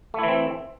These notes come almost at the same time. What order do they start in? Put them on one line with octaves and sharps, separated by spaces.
A3 E4 E3 C4